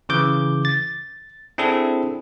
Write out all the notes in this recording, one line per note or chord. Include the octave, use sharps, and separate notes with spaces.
C#3 E3 D6 G6
A6
C4 D4 E4 G#4 A4